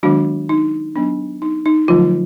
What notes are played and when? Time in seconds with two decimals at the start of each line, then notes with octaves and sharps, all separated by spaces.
0.03 D#3 F#3 G#3 B3 D4 F#4
0.49 D#4
0.96 F#3 B3 D4
1.42 D#4
1.66 D#4
1.88 D3 F3 F#3 A3 F4